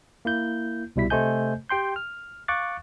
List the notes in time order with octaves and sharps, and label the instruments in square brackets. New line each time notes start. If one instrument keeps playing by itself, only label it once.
[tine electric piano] A#3 E4 G6
C2 B2 G3 E4 B6
C3 A3 C5 D#5 G#5 G6
G4 G5 C6 G6
F6
F5 C#6 D6 F#6 A6